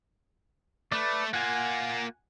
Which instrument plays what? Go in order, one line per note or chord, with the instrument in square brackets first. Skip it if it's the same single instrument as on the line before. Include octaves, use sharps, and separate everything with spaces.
[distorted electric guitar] A3 [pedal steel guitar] B4 D5
[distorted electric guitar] A#3 F4 [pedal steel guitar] F#5 G#5